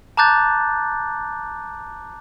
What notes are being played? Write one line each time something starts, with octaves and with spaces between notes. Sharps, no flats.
A5 A#5 D6 F#6 G6 A6